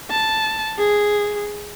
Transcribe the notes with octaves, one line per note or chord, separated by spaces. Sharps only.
A5
G#4